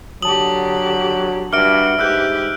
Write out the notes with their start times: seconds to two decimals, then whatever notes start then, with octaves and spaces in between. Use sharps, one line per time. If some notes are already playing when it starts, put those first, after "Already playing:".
0.22 D3 F#3 G4 A5 D#6 F#7
1.53 G2 F#4 E5 F#5 D6 F6 D7
1.99 G#2 G4 B4 E6 F#6 G6